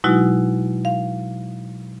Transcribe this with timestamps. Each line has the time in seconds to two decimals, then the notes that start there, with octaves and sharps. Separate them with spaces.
0.04 B2 F#3 G#3 D#4 E4 F#4
0.85 F5